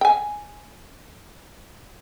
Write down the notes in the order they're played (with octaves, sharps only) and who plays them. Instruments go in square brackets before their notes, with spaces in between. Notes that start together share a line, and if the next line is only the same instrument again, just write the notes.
[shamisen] G5 G#5